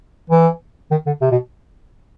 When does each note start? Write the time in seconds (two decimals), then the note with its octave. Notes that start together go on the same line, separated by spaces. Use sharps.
0.30 E3
0.91 D#3
1.06 D3
1.21 C3
1.31 B2